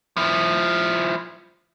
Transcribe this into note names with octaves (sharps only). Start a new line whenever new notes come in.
F3 E4